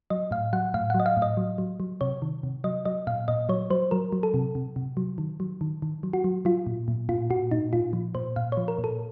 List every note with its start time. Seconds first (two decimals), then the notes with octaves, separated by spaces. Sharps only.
0.10 F#3 D#5
0.31 A2 F5
0.53 F#3 F#5
0.74 A2 F5
0.90 F#3 F#5
1.00 D#5
1.06 F5
1.17 A2
1.22 D#5
1.37 F#3
1.58 F#3
1.80 F#3
2.01 C3 C#5
2.22 D#3
2.43 C3
2.64 F#3 D#5
2.85 F#3 D#5
3.07 A#2 F5
3.28 A#2 D#5
3.49 F#3 C#5
3.70 F#3 C5
3.91 F#3 A#4
4.12 F#3
4.23 A4
4.34 C3
4.55 C3
4.76 C3
4.97 F#3
5.18 D#3
5.40 F#3
5.61 D#3
5.82 D#3
6.03 F#3
6.13 F#4
6.24 F#3
6.45 F#3 F4
6.67 A#2
6.88 A#2
7.09 A#2 F4
7.30 A#2 F#4
7.51 A#2 D#4
7.73 A#2 F4
7.93 F3
8.15 A#2 C5
8.36 A#2 F5
8.52 F3 C#5
8.68 A#4
8.78 A#2
8.84 A4